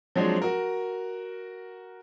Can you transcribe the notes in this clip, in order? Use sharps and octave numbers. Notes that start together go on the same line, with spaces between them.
F3 F#3 G#3 C4 D4
F#4 A#4